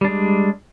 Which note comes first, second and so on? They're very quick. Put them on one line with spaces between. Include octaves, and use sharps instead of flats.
G3 D4 G#3